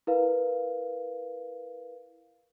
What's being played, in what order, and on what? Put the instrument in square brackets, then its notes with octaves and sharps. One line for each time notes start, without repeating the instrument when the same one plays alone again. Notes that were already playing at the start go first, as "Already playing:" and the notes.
[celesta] E4 A#4 B4 F5